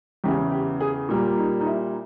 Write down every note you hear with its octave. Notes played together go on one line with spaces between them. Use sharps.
E2 C#3 E3 G4
G4
G#4
A#2 G3 A#3
D#4
D#4
E4